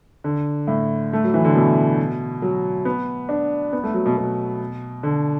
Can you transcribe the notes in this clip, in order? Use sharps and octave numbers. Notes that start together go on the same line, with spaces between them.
D3
A2
A3
F#3
E3
D3
B2
F#3
B3
D4
B3
A3
F#3
B2
B2
D3